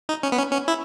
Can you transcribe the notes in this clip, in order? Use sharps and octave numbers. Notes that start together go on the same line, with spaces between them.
D#4
C#4
B3
C#4
C#4
E4